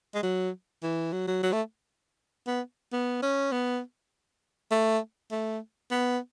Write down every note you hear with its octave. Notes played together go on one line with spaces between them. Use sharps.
G#3
F#3
E3
F#3
F#3
F#3
A3
B3
B3
C#4
B3
A3
A3
B3